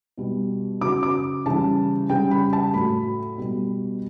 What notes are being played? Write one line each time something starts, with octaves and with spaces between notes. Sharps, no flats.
B2 G3
C#3 F#3 D6
D6
C#3 E3 G3 A5
C#3 G3 G5
B5
A5
A2 F#3 B5
B2 G3